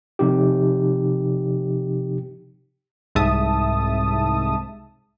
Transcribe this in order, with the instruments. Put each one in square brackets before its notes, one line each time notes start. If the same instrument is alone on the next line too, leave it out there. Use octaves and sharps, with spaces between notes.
[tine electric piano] C3 F3 D#4 G4
[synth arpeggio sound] C2 G#2 E5 A5 D#6